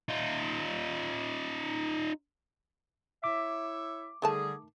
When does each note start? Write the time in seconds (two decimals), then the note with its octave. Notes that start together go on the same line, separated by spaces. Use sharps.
0.09 D#4 F4
3.24 E4 C#5 E5 D6
4.22 D3 D#3 G3 A3 G#4 A5